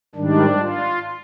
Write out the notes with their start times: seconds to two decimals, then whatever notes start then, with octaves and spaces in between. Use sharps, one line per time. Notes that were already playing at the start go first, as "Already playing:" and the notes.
0.15 G#2 D#3 G3 D4
0.59 F4